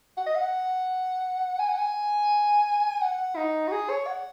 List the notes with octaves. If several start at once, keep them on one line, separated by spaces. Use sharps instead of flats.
F#5
D#5
F#5
G#5
F#5
G#5
F#5
D#4
F#4
G#4
C#5
F#5